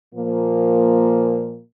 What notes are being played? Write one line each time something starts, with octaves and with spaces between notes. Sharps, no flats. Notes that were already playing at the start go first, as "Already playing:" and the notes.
A#2 F3 A#3